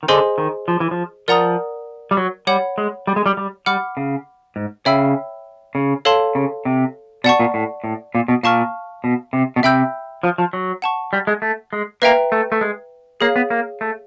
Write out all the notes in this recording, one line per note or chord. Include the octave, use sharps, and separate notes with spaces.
D#3
D3 G#4 C5 D#5 G#5 C6
D#3
F3
E3
F3
F3 A#4 D5 F#5 A#5 D#6
G3
F#3
G3 C#5 F#5 B5
G#3
G3
G#3
G3
G3
G3 F#5 B5 D6 F6
C#3
G#2
C#3 C#5 E5 G5 B5 E6
C#3
A4 C#5 F5 A5 C6
C#3
C3
B2 D5 F#5 A5 C#6
A#2
A2
A2
A#2
B2
A#2 F5 A5 C#6 F6
B2
C3
B2
C3 E5 G5 B5 E6 G6
F3
F3
F#3
F#5 A5 C#6
G3
G#3
A3
G#3
A#3 B4 E5 G5 A#5
A3
A3
G#3
A#3 G#4 C#5 F5
B3
A#3
A3